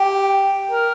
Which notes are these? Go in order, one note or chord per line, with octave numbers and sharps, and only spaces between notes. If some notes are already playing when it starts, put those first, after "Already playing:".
Already playing: G4
A#4